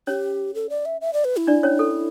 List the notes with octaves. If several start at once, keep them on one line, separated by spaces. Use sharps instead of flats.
C#4 G4 C#5
A4
D5
E5
E5
D5
B4
E4
D4 D5
C#4 C#5
A4